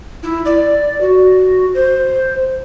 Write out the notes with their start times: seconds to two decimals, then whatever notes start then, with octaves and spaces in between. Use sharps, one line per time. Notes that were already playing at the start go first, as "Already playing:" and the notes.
0.23 E4
0.45 D5
1.01 F#4
1.74 C5